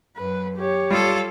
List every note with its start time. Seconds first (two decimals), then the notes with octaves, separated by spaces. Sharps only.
0.17 F#2 B4
0.57 G4 C#5
0.90 G3 F4 A4